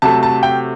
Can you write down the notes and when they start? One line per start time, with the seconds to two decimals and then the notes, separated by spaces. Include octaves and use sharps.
0.02 C3 F#3 A3 A5
0.23 A5
0.43 G5